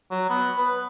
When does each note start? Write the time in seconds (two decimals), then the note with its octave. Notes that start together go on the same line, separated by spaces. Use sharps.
0.11 F#3
0.30 B3
0.58 B4